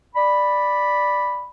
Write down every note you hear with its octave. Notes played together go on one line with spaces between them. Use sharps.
D5 B5